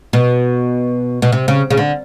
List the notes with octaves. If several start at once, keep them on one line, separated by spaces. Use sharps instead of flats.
B2
B2
C3
C#3
C#3
D3